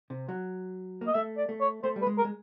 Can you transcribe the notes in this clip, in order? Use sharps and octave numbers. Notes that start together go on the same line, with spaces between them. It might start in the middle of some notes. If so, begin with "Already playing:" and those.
C3
F#3
A#3
D#5
A3 E5
D5
A3
C#5
A3 C5
G3
B4
G#3
A#4
G#3